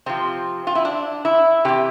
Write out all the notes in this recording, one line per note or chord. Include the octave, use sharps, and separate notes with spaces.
C3 F3 C4
F4
E4
D4
E4
C3 E3 G4